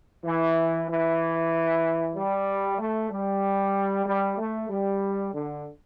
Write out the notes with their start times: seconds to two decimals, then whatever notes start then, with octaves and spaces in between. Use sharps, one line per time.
0.24 E3
0.88 E3
2.15 G3
2.78 A3
3.10 G3
4.06 G3
4.37 A3
4.69 G3
5.33 D3